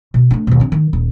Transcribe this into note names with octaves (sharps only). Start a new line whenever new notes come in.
B2
A3 D4
D#2 B2
C4 D4
D#3
D#1